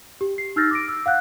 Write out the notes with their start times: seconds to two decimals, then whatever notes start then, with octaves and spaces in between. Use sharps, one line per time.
0.21 G4
0.38 C7
0.56 D#4 E6 F6 G6 A6 A#6
0.71 D6 A#6 D7
0.88 E6
1.06 F5 F#5 F#6 G6